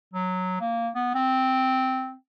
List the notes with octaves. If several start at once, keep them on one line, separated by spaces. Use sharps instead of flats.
F#3
A#3
B3
C4